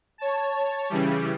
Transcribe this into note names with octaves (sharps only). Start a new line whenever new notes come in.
C#5 A5
C#3 E3 G3